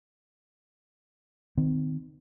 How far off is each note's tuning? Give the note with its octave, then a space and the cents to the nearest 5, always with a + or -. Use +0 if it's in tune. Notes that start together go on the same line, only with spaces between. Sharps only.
D#3 -10 C4 -40